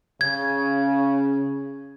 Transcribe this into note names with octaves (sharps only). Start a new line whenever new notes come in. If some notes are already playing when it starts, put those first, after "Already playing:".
C#3 G#6